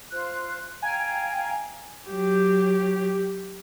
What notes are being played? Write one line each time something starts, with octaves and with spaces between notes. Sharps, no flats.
F4 C5 F#6
F5 G5 G#5 A#5
F#3 G4